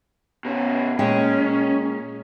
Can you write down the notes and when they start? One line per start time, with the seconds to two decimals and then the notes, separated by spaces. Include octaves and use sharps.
0.45 B2 C#4
0.99 A#2 G#3 C#4 G5